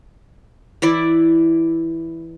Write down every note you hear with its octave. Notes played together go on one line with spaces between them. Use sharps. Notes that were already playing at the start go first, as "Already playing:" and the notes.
E3 E4 D5